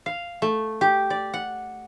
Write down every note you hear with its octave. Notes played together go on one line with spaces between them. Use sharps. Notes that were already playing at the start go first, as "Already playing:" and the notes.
F5
A3
G4
D5
F#5